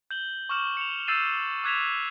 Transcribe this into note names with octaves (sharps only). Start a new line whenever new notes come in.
G6 F#7 G7
C#6 D6 F6 E7 F#7
C#7 E7 F7
E6 G6 A6 C7 D#7 E7
D6 F#6 G#6 B6 E7 F7